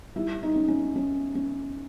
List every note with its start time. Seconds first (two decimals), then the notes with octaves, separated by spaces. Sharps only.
0.16 G3 E4
0.43 D#4
0.56 C#4
0.68 C#4
0.96 C#4
1.35 C#4